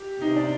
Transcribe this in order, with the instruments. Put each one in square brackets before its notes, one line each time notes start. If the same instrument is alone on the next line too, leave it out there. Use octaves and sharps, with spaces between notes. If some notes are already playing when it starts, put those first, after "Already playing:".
Already playing: [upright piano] G4
[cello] C3 [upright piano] D#4
[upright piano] D4